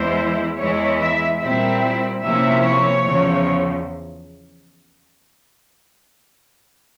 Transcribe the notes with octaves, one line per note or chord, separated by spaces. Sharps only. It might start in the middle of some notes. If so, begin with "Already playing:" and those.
Already playing: E2 E3 G#3 E4 C5
E2 E3 G#3 E4 C#5
E5
A#2 G3 C4 E4 E5
C3 F3 A#3 C#4 E4 E5
C#5
E2 C#3 F3